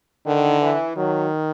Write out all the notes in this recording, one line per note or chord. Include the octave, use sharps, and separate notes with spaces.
D3 D#3
E3
D#3 F#3